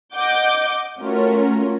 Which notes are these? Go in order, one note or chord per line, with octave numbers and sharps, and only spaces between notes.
D#5 F#5 D6 G6
A3 C#4 F4 F#4 A#4